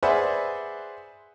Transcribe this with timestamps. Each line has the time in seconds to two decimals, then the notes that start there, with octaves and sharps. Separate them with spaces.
0.03 G#4 B4 C5 D5 E5 F#5